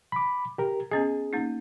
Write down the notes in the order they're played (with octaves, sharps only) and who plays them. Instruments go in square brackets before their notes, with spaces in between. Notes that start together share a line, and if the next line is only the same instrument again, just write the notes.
[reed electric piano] B5 D6
G4 A#4
[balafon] B3 C#4 D#5 [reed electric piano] G#4
[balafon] A#3 C#4 D#4